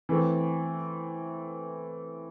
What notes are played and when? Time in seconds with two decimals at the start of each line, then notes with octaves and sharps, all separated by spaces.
0.09 E3 A3 C4